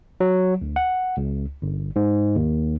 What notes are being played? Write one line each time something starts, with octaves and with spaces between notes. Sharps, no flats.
F#3
D2
F#5
C#2
G1
G#2
D#2